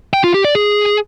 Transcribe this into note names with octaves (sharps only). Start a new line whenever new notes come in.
G5
F4
G4
D5
G#4